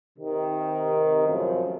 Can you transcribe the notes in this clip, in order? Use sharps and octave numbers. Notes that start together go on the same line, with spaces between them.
C3 D#3
C2 F#2 A2 F3